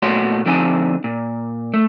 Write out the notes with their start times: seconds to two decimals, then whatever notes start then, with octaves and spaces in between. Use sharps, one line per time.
0.02 A#2 A3 B3 F#4 C#5 C6
0.46 D3 F3 C4 D#4 G#5
1.04 A#2
1.74 A3